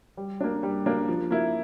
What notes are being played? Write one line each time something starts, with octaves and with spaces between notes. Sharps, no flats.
G3
A#3 D4
G3
A#3 D4
F3
A#3 E4